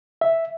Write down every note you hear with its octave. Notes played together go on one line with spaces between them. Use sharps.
E5